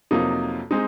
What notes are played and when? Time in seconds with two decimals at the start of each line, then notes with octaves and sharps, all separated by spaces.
0.11 F2 C3 F#3 A#3 D#4
0.71 G#3 C4 D#4